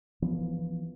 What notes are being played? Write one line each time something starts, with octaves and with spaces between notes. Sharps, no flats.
E3 F3 B3